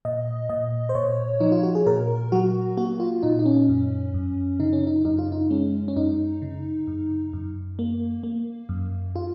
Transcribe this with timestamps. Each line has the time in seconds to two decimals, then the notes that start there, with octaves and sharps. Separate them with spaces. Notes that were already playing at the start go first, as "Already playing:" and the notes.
0.05 A#2 D#5
0.49 A#2 D#5
0.89 C5
0.95 A#2 C#5
1.40 F3 D#4
1.52 F4
1.63 F#4
1.75 G#4
1.86 A#2 A#4
2.32 F#3 F#4
2.77 A#3 F#4
3.00 F4
3.23 A#2 D#4
3.39 D#4
3.46 C#4
3.69 F#2
4.14 F#2
4.60 C#3 D#4
4.73 C#4
4.87 D#4
5.05 F#2 D#4
5.19 F4
5.32 D#4
5.50 G#3 C#4
5.88 C#4
5.96 F#2 D#4
6.42 C#3
6.87 F#2
7.33 F#2
7.79 A#3
8.23 A#3
8.69 F#2
9.16 F4